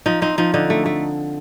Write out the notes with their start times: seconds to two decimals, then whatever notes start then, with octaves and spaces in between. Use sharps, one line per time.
0.06 F3 D#4
0.22 C4 D#4
0.38 F3 D#4
0.54 D3 D#4
0.70 A3
0.86 A3